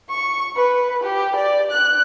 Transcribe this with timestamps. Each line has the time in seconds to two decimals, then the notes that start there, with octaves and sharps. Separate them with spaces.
0.10 C#6
0.56 B4
1.04 G4
1.36 D5
1.71 F#6